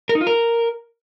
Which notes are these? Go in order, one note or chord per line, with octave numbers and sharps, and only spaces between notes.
A#4
D#4
F4
A#4